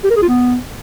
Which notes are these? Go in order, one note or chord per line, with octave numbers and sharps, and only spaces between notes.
G4
A#4
G#4
F4
B3